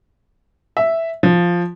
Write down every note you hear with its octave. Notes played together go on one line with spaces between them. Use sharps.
E5
F3